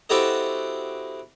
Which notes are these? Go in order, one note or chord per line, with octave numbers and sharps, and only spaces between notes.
C4 E4 F#4 G4 A4 D#5